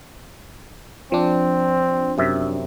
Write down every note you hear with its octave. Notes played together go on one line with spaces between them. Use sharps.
F3 C4 D4
F#2 C3 E5